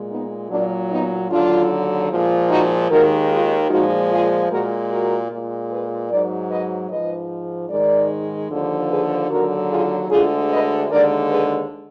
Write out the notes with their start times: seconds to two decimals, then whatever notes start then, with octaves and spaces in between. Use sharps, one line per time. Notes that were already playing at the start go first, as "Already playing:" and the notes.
Already playing: A#2 G#3
0.10 B3 D#4
0.50 A#2 F#3 A#3 D4
0.90 B3 D#4
1.30 D#2 D3 F#3 D4 F4
2.11 A#2 F3 G#3
2.50 D#4 F#4
2.90 D#2 D#3 G#3 F#4 A#4
3.30 F4 G#4
3.70 A#2 F3 G#3 D#4 F#4
4.10 F4 G#4
4.50 A#2 G#3 F#4 A#4
4.90 F#4 A#4
5.30 A#2 G#3
5.70 G#4 B4
6.10 G#2 F#3 A#4 D5
6.50 B4 D#5
6.90 G#2 F3 G#3 B4 D#5
7.69 G#2 D#3 G#3 A#4 D5
8.50 D#2 D3 F3
8.89 G#4 B4
9.29 D#2 D3 F#3 F#4 A#4
9.69 F4 G#4
10.09 D2 D3 G#3 F4 G#4
10.50 B4 D#5
10.89 D#2 D3 G#3 A#4 D5
11.29 G#4 B4